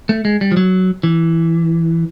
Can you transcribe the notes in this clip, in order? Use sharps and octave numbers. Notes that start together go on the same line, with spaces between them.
A3
G#3
G3
F3
F#3
E3